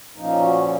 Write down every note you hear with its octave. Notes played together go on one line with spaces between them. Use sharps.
A#2 F3 A#3 C#4 D#4
F#4